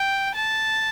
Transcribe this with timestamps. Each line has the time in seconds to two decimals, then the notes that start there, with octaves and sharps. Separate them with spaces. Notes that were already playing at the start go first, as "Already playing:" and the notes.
Already playing: G5
0.35 A5